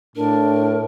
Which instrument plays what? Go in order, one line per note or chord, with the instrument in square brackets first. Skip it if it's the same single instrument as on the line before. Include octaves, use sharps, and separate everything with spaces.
[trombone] A2 [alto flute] D4 [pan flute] A#4